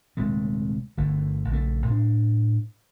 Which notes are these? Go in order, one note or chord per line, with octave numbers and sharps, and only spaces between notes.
D#1 C3 G#3 A3
G1 D3 A3
A#1 C#3 A3
A2 D4